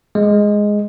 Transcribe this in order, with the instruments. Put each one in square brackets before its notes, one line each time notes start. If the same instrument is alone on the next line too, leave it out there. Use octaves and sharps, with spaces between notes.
[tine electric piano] G#3